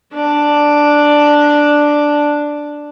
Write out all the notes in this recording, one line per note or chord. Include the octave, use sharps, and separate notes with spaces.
D4 D5